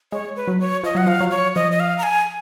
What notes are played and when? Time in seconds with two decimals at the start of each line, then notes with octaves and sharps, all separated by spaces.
0.12 G#3 C#5
0.36 B4
0.48 F#3
0.60 C#5
0.83 F3 D#5
0.95 F#3 F#5
1.06 F3 F5
1.20 F#3
1.31 C#5
1.55 F3 D#5
1.72 D#5
1.80 F5
1.98 A#5
2.03 G#5